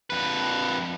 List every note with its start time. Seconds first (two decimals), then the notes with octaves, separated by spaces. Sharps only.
0.10 F2 B4